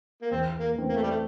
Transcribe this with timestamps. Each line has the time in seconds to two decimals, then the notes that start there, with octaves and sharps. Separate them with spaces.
0.22 A#3
0.31 E2 C4
0.60 A#3
0.75 E3 A3 C4
0.89 A#3
0.96 A3
1.03 G3
1.10 A3